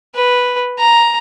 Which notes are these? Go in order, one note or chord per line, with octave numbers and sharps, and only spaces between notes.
B4
A#5